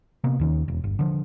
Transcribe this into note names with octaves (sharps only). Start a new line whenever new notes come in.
C3 A#3 B3
D#2 D#3 C#4
E1
G1
D3 F3